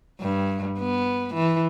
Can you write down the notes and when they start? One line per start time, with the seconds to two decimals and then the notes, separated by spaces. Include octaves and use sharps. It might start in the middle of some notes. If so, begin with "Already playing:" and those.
0.20 G2
0.79 B3
1.34 E3